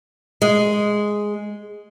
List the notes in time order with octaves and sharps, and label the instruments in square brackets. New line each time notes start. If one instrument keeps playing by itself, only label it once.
[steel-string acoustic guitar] G#3